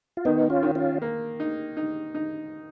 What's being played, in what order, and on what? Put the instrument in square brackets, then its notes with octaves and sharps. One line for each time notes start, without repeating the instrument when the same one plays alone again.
[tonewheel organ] F4
[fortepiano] D#3 [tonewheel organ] B3 D#4
[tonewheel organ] C#4 F4
[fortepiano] D#3
[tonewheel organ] C#4 F4
[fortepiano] A#3
D#4
D#4
D#4